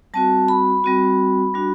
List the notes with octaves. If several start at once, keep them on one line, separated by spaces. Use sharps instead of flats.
G3 C4 F#4 A5
B5
G3 C4 F#4
G3 D4 F#4